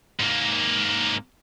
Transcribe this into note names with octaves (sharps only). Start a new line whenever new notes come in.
G#2 A#3